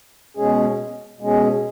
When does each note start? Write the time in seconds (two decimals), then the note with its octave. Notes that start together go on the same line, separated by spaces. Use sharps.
0.37 B2 G#3 C#4 G#4
1.20 B2 G#3 C#4 G#4